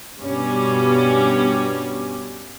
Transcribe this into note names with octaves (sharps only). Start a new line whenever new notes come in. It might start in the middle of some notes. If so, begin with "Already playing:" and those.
G2 B2 G3 C#4